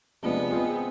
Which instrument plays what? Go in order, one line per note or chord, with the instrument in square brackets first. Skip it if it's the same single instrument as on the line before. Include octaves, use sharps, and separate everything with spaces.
[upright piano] C3 F3 G#3 D4 [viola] B3
[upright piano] G#3 C4 F4 G#4